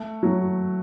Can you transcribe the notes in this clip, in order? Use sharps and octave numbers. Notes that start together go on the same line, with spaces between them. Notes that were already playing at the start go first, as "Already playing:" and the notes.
Already playing: A3
F#3